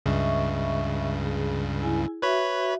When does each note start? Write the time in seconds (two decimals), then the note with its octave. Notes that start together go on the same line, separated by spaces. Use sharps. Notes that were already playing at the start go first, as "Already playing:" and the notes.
0.06 C#2 G2 C#3 D#5 E5 C#6
1.26 G#4
1.82 E4 G#4 G#5
2.22 F#4 B4 C#5 E5 B5